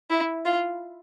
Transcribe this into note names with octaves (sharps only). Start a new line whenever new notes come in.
E4
F4